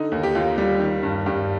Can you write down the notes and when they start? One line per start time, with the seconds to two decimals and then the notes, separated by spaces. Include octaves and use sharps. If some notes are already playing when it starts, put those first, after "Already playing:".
Already playing: D3 D#4
0.12 D#2
0.23 G4
0.35 D#2 F4
0.58 G3
0.80 D#3
1.03 G2
1.26 G2 G4